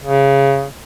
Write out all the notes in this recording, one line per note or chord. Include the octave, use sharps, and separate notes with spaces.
C#3